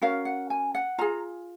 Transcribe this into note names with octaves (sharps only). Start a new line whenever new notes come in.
C#4 F#4 A#4 F5
F#5
G#5
F#5
F4 G#4 A#5